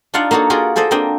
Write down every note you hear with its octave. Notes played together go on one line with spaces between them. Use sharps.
D4 D#4 F4 D5 F5 F#5
A#3 D#4 F#4 A4 C#5
F4 F#4 G#4 A#4 D5
G#4 A4 C5 D5 D#5
A#3 C4 D4 D#5 G5